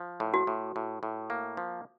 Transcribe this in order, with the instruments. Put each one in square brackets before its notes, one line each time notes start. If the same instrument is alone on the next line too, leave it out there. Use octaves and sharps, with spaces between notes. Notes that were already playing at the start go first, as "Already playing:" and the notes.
Already playing: [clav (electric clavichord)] F3
A2
[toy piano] F#4
[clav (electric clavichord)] A2
A2
A2
A#3
F3